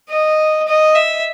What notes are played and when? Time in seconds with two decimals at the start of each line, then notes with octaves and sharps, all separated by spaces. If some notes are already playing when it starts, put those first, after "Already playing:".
0.10 D#5
0.67 D#5
0.95 E5